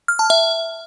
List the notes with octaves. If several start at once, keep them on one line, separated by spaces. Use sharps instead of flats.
F6
A5
E5